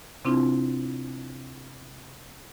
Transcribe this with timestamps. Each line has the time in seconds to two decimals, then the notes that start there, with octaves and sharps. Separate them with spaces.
0.25 C3 C4 D4 E4 F4